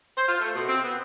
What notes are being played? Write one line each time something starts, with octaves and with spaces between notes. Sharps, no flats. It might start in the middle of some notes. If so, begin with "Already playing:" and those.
C5
F4
A3
B2
C4
B3